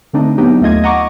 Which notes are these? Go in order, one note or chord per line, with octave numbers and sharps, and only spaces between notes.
D3 A3 C4 D4 D#4
F#3 B3 D4 D#4 G4
D#2 A3 F4 D#5 G#6
D#5 F#5 A#5 C#6 D6